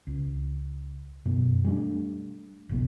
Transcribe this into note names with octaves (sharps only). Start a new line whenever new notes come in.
C#2
F#2 B2
G3 A3 B3 D4
F1 B1 B2